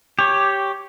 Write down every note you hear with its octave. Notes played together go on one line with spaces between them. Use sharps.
G4 C#5